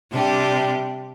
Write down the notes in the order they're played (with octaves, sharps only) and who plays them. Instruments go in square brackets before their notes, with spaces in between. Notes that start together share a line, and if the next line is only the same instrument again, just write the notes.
[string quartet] C3 G3 D4 G4